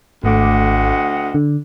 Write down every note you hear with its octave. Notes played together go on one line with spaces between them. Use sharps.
G#1 D2 A3 D#5 F#5 D6
D3